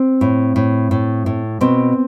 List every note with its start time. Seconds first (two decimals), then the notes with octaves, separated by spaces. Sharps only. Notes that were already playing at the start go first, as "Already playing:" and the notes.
Already playing: C4
0.21 A2
0.56 A2
0.91 A2
1.26 A2
1.61 B2 C4